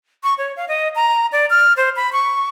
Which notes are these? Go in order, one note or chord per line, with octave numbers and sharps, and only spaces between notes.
C#6
C#5
F5
D#5
A#5
D5
F6
C5
B5
C#6